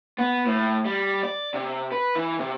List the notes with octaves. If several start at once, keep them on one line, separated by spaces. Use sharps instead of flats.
B3
A2
G3
D5
C3
B4
E3
C3